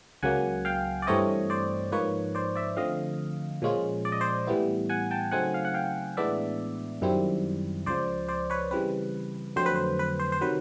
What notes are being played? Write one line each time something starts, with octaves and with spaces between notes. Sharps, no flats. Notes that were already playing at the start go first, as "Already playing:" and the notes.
C#2 C#3 F#3 A#3 F#5 G#5
F5 G5
D5
G2 E3 A3 C4 E4 C#5 D#5
C5 D5
G#2 F3 A#3 D#4 B4 C#5
C5 D5
D5 E5
D3 F3 A3 C4 D#5 F5
A#2 F3 G#3 C#4 F4
D5
D#5
C5 D5
A2 E3 G3 B3 E4
F#5 G#5
G5 A5
C#3 F#3 A3 C4 D#4 F#5 G#5
F5
F#5
F5 G5
A2 E3 G#3 B3 D4 D5 E5
F#2 D#3 G3 C4 E4
C#2 C#3 F3 C5 D5
C5 D5
B4 C#5
C#3 E3 G3 C4 B4
F2 D3 F#3 A3 C4 C5
B4
C5
B4
C5
C5
C3 D#3 F#3 B4